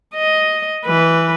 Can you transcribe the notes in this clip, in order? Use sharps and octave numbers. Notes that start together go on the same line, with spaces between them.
D#5
E3 B4